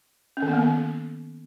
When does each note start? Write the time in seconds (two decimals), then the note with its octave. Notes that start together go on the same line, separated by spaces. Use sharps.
0.37 C#4
0.42 D#3
0.48 B3
0.53 A#3
0.59 D#3